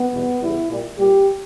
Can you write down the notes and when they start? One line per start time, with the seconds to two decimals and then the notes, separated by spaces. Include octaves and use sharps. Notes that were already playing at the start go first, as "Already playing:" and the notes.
Already playing: B3
0.11 E2 B2 G3
0.40 E2 C#3 G3 E4
0.69 A#2 G3
0.97 A#2 G3 G4